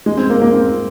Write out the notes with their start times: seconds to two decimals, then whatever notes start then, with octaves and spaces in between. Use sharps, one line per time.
0.06 G#3
0.17 C4
0.30 A#3
0.42 A#3
0.54 C4